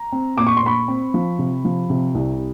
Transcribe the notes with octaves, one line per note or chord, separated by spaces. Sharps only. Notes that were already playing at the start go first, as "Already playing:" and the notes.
Already playing: A#5
C4
A#2 D6
C#6
C6
A#2 B5 C#6
C4
F3
C3
F3
C3
C2